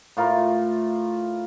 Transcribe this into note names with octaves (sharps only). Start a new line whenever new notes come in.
A2 F4 A#4